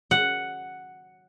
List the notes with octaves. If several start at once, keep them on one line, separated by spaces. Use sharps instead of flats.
F#5